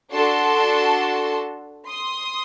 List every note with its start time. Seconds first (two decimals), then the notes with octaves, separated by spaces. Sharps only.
0.11 D4 F#4 A4 A5 C6
1.86 C6 D#6